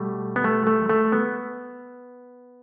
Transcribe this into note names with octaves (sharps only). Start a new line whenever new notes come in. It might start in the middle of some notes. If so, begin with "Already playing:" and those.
Already playing: B2 G3 A3
B3
A3
A3
A3
B3